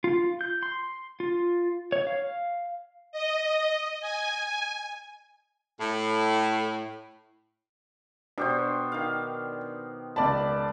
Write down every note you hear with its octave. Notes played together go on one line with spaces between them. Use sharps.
F4
G6
C6
F4
C#5
F5
D#5
G#5
A2
B2 D4 G4 C5
D#3 F5
C#2 D5 A5 B5